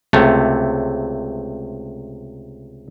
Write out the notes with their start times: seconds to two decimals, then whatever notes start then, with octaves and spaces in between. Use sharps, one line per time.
0.13 C#2 C3 A3